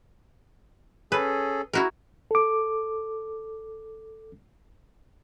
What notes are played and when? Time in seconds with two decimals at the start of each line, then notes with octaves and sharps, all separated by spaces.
1.12 C#4 G#4 A4 B4
1.73 E4 F#4 A#4
2.31 A4 D6